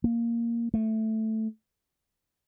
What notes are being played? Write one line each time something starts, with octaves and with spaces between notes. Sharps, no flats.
A#3
A3